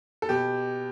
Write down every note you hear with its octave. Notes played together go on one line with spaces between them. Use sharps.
A4
B2 G4